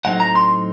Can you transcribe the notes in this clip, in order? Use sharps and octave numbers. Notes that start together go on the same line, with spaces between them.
A2 F#3 C4 D#4 F#5
A#5
C6